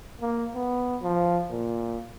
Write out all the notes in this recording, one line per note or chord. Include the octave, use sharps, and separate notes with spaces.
A#3
B3
F3
A#2